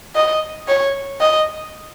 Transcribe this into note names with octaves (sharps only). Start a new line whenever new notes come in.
D#5
C#5
D#5